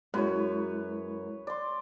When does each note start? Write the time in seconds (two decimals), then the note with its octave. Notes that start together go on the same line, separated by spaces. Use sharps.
0.14 F#2 G#3 E4 B4 C#5
1.47 D5 C6